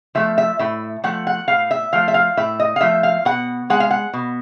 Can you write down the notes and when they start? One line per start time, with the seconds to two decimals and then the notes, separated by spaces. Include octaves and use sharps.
0.15 F3 A3 E5
0.38 E5
0.59 A2 E5
1.04 F3 A3 F#5
1.27 F#5
1.48 A2 F5
1.71 E5
1.93 F3 A3 F5
2.08 E5
2.14 F5
2.37 A2 E5
2.60 D#5
2.76 F5
2.81 F3 A3 E5
3.03 F5
3.25 B2 F#5
3.70 G#3 F#5
3.80 F5
3.91 F#5
4.14 B2